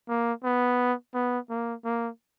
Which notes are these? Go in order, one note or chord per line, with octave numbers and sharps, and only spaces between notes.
A#3
B3
B3
A#3
A#3